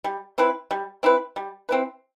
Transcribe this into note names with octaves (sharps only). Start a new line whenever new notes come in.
G3
C4 E4 B4
G3
C4 E4 B4
G3
C4 E4 B4